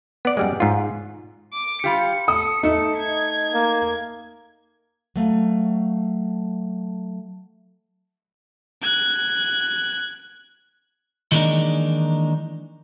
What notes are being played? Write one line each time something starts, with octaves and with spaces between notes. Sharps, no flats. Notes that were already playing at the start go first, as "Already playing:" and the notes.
B3 D5
F#2 G3 G#3
G#2 F4
D6
G3 F4 G4 C#7
A4 D#6
A3 D#4 A4
G#6
A#3
F#3 A3 F5
F#6 G#6
D#3 E3 G#3 A#3 D4 D#4